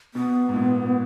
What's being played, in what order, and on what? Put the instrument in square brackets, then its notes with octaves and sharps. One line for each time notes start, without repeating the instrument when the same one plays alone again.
[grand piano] B2 [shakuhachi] B3
[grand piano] G#2
A#2